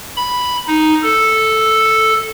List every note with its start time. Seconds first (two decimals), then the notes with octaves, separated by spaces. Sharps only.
0.16 B5
0.67 D#4
1.03 A4